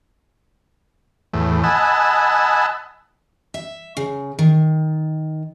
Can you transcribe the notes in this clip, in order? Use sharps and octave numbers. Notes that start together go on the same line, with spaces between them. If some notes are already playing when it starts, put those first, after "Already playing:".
E2 A2
D#5 F#5 G#5 A5 B5 E6
E5
C#3
D#3